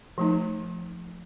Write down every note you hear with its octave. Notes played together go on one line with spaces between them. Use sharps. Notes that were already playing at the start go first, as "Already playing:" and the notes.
F3 A3 D#4